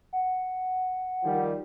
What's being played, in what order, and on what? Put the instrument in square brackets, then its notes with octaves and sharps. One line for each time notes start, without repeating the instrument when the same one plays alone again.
[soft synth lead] F#5
[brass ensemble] D#3 F3 G3